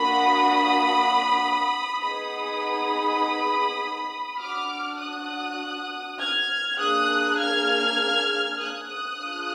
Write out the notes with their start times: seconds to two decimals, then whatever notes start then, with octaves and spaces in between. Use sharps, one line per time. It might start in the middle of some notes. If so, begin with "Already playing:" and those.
Already playing: A#3 D4 F#4 B5 D#6
2.01 B3 D#4 G#4 B5 D#6
4.40 D4 F#4 D6 F6
5.00 D#6 F#6
6.20 F6 G#6
6.79 A#3 D4 G#4 D#6 F#6
7.38 F6 G#6
8.58 D#6 F#6
8.89 D#6 F#6
9.18 D4 F4 G#4